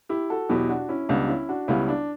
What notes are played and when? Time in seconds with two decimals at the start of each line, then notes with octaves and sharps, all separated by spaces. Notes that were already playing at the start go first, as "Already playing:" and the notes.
0.09 E4 G4
0.30 F#4 A4
0.49 E2 B2 F#3 E4 G4
0.69 D4 F#4
0.89 C#4 E4
1.09 C#2 C#3 G3 B3 D4
1.28 C#4 E4
1.49 D4 F#4
1.68 C#2 C#3 G3 B3 C#4 E4
1.88 D4